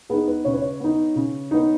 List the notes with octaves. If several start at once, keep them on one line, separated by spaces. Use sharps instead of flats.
B3 D#4 G#4
B4
C#3 C#5
B4
C#5
B3 D#4
C#3
B3 D#4